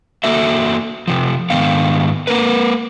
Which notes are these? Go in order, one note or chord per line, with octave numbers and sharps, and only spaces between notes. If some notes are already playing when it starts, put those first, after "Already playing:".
A#3 F#4 A4 E5
C3 F3
G#2 D#3 B3 F5
A#3 A#4 B4